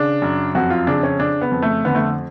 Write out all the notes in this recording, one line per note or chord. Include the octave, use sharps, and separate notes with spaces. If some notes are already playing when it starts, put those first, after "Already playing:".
Already playing: C#3 D4
F#2
F2 F#4
F4
C#3 D4
C#4
C#3 D4
B3
F2
A3
D3 B3
A3